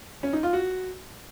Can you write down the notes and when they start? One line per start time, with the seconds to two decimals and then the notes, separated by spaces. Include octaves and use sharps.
0.23 C#4
0.33 D#4
0.43 F4
0.53 F#4